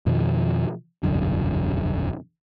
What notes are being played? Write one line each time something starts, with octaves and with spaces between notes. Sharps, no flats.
F2 B2 D#3 F3
E1 C2 F#2 D3